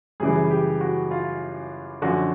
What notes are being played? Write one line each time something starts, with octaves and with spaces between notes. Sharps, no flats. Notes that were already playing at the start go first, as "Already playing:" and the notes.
F#2 C#3 E3 G3 G#4
G4
F#4
F4
F#2 D3 F3 F#4